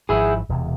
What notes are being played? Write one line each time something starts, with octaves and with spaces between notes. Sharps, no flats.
G#1 G#2 F3 E4 G#4
E1 E2 C3